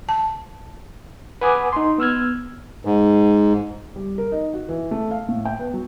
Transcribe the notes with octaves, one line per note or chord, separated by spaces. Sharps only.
A5
B4 F#5 G#5 D6 D#6
D#4 C6
B3 E6 F6 G#6
G#2
G3
A#4
D#4
F#4
E3
A3
F5
A2
G5
B3
F#3